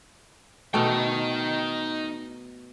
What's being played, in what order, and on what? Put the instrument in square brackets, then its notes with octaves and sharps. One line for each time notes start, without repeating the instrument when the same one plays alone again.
[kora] B2 A3 [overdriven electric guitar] D#4 G5